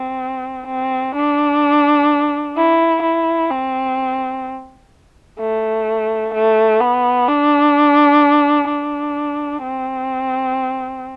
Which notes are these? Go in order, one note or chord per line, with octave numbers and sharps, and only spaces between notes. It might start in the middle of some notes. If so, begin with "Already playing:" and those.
Already playing: C4
C4
D4
E4
E4
C4
A3
A3
B3
D4
D4
C4